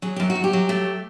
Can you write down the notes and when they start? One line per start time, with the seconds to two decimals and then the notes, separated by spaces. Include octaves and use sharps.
0.02 F#3 G#4
0.16 F#2 G4
0.30 F#4
0.35 F#2
0.44 G4
0.53 F#3
0.69 A3